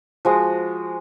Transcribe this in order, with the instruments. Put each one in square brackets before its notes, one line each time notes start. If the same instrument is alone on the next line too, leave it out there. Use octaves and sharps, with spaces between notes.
[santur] F3 G#3 F#4